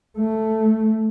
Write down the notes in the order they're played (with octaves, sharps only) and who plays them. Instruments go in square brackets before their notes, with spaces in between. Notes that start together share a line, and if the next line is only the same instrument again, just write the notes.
[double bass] A3